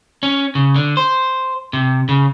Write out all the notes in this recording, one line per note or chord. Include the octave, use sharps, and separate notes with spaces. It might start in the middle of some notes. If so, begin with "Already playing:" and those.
C#4
C#3
D3
C5
C3
C#3